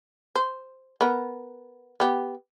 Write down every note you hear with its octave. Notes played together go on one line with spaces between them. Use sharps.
C5
B3 A#4
B3 G4